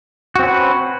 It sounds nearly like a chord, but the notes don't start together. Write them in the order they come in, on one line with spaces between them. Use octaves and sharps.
F#4 C4 C#4 B4